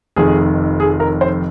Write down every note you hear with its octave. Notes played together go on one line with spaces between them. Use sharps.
F1 F2 D#3 G#4
G#4
A#4
C5